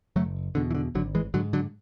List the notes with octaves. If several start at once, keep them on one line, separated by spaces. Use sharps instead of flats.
F#1 F#3 A3
E2 B2 D3
E3
D3
G#1 D3 F#3
E3 G#3
G#2 D3 F#3
D3 F#3